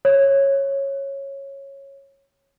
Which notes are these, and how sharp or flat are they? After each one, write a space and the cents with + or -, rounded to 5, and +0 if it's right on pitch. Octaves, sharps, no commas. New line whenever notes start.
C#5 -10